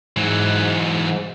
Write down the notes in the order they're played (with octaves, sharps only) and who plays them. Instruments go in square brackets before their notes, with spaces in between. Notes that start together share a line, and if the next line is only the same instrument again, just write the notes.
[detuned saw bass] G#2 [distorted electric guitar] E3 F#3